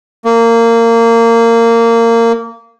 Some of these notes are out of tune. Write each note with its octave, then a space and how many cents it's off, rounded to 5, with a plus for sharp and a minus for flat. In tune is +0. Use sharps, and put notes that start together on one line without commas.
A#3 -20